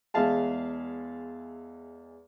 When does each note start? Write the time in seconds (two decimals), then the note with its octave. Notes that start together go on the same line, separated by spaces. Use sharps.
0.14 E2 G#3 G#4 E5 F5 A5